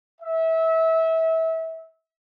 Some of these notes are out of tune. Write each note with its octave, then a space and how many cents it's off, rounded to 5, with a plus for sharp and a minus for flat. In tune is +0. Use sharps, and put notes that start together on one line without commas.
E5 -25